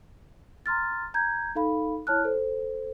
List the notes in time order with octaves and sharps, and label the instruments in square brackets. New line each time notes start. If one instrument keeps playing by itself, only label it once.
[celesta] A#5 C6 F6 A6
A#5 G6 G#6
D#4 A4 F5 B5
E4 C#5 A5 F6 F#6
A4 C5